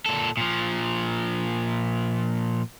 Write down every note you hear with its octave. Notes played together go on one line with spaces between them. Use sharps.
A#2 A4
A#2 F3